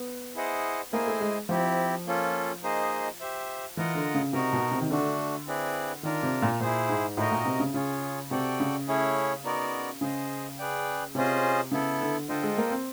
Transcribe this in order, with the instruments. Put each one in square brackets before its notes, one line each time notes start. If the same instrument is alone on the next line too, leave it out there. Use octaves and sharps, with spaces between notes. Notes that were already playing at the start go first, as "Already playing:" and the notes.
Already playing: [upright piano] B3
[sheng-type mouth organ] E4 G#4 C5 D#5 F#5
[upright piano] A#3 [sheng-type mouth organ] E4 G#4 C5 D#5 G#5
[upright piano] A3
G#3
[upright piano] F3 [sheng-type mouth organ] C4 E4 G4
[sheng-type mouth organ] A#3 C#4 F4 A4
A#3 D#4 G#4 C5 D#5
G4 C5 E5
[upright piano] E3 [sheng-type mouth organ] F4 A#4 D#5 F#5
[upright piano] D3
C#3
[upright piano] C3 [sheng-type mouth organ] D#4 F#4 A#4
[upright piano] B2
C3
D#3
[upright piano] D3 [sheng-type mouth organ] A3 D4 F#4
[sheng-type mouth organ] C4 E4 G#4 B4 D5
[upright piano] D#3 [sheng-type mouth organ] D4 F4 A#4
[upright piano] C3
A#2
[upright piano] A#2 [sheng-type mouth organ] E4 G#4 C5
[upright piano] G#2
[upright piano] A2 [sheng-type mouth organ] D#4 F#4 A#4 D#5
[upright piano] A#2
C3
C#3
[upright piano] C#3 [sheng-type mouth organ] F4 G#4 C#5
[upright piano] C3 [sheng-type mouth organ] F#4 A4 D5 G5
[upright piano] C#3
[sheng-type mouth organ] A3 C#4 E4 G#4 C#5
B3 D#4 F#4 A#4 D5
[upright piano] C#3 [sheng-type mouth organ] G#4 C5 D#5
[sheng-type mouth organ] G#4 B4 D5 G5
[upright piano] C3 [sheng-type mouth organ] C#4 F4 G#4 C5 D#5
[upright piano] C#3 [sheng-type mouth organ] B3 E4 A4
[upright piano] D3
[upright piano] D3 [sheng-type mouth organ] F4 A4 C5 D#5 G5
[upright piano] G#3
A#3
C4